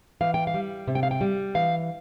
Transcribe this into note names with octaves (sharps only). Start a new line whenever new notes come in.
E3 F5
G5
F5
G3
C3
G5
F5
G5
G3
E3 F5